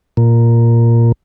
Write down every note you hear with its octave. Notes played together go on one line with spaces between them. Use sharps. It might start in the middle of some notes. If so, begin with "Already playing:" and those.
A#2